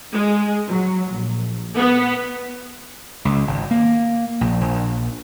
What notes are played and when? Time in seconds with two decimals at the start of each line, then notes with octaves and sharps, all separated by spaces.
0.11 G#3
0.67 F#3
1.12 A#1
1.77 B3
3.25 C#2
3.47 G#1
3.71 A#3
4.41 A#1
4.61 A#1